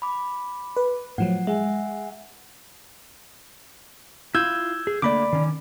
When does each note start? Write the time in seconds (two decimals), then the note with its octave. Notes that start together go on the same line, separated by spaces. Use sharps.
0.02 B5 D6
0.77 B4
1.18 A2 F3 F#3 F#5
1.47 G#3 E5 F#5 G#5
4.35 E4 F4 E6 G6 G#6
4.87 G#4
5.02 D3 A3 A#3 D5 B5 D6
5.33 D#3 C#4